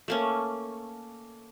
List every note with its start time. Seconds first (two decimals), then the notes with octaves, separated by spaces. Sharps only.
0.08 A3 A#3 C#4